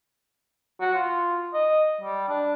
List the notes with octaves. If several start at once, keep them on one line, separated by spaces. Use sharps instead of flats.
F#4
F4
D#5
G3
D4